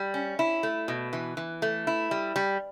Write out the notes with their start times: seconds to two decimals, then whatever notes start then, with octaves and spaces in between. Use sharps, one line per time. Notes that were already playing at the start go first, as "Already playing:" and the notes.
Already playing: G3
0.14 C#4
0.39 E4
0.63 A3
0.88 B2
1.13 E3
1.37 E3
1.62 A3
1.87 E4
2.11 G3
2.36 G3